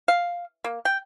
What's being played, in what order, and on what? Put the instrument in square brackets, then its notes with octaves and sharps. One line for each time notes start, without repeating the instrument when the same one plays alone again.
[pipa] F5
A#3
G5